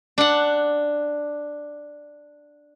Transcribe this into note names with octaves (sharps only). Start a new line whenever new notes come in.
D4 F#5